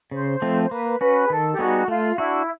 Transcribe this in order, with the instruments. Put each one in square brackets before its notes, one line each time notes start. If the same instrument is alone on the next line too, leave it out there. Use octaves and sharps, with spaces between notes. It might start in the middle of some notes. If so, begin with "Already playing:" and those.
[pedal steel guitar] C#3 [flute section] C5
[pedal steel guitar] F3 A3 C4
[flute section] C5
[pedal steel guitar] A#3 [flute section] B4
[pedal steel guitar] C#4 F#4 [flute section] B4
[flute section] G#4
[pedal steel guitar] D#3 [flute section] A4
[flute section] G4
[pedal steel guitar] G3 B3 D#4 G#4 [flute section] F#4
[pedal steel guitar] A3 [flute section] F4
[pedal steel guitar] D4 F#4 [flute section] E4